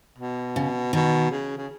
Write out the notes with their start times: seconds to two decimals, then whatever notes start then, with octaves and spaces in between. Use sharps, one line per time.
0.19 B2
0.56 C#3
0.93 B2 D#3
1.31 C#3
1.58 C#3